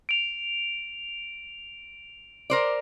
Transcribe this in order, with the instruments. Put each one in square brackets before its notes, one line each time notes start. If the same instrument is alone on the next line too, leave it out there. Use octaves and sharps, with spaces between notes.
[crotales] D7 F7
[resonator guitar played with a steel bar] A#4 C5 D5